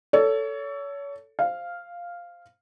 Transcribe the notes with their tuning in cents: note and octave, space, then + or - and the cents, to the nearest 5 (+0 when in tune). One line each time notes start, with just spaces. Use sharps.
A4 +10 C#5 +30
C5 +0 F5 +0